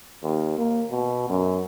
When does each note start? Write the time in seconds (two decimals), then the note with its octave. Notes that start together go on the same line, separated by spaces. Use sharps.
0.22 D#2
0.58 A#3
0.91 B2
1.29 F#2